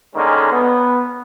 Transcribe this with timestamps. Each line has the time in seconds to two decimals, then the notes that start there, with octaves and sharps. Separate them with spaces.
0.14 D3 D#3 G#3 A#3 C#4
0.52 B3